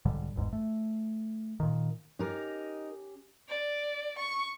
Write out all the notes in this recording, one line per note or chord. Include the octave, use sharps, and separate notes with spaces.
B1 G#2 D3 G3
G1 E2 G#2
A3
A#2 D#3
C#4 D#4 G4 A#4
D5
C#6